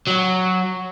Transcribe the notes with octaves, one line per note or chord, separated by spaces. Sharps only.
F#3